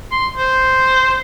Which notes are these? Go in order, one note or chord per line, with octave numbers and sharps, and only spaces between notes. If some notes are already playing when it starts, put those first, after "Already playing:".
C6
C5